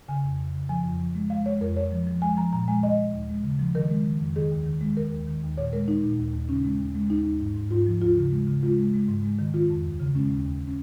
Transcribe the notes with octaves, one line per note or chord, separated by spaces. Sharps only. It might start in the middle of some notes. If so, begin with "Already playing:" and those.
C#3 G#5
F2
F2
C#3
F3 G#5
F2
F3
G#3
G#3 F5
G#3 C#5
F2 A#4
F2 C#5
F3
F3
G#3 G#5
F3 A#5
A#2 A#5
G#3 G#5
G#3 D#5
G#3
D#2
G#3
C#3
F3
D#3 A#4
G#3
D#3
F2
D#3 G#4
D#2
D#3
G#3
D#3 A#4
D#2
D#3
D#2
A#2 C#5
G#3 A#4
G#3 D#4
A#2
D#2
D#2
C#3 C#4
G#3
D#2
G#3
D#2 D#4
D#2
G#2
G#2
G#2 F4
F3
D#2 F4
C#3
G#3
C#3
G#3 F4
G#3
G#3
G#2
G#3
D#3
D#3 F4
F2
D#2
C#3
G#3 C#4
D#2
D#2
C#4